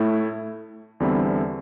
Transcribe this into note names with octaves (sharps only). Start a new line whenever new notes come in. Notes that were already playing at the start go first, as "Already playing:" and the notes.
Already playing: A2 A3 E4
E2 D3 G3 C4 E4